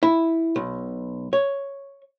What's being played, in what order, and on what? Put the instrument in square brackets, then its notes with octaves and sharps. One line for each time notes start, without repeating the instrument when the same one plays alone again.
[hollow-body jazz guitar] E4
B1
C#5